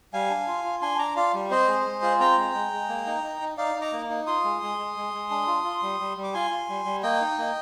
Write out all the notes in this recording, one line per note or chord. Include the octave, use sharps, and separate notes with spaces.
G3 F5 G#5
D4
F4
F4
D4 G#5 C6
D4 A#5 D6
F4 D5 F5
G3
C4 C5 D#5
G#3
G#3
F4
C4 G5 A#5
G#3
G#3
G#3
A#3
D#4
D#4
D#4
D#4 D5 F5
D#4
A#5 D6
A#3
D#4
F4 C6 D#6
G#3
G#3
G#3
G#3
G#3
D4
F4
F4
G3
G3
G3
D6
F4 G#5 C6
F4
G3
G3
A#3 D#5 G5
D#4
A#3